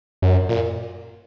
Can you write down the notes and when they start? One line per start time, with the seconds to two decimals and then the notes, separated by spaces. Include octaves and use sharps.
0.22 F#2
0.49 A#2